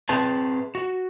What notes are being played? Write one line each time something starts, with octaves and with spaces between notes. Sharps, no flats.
C4 G#4 B4 A5
F#4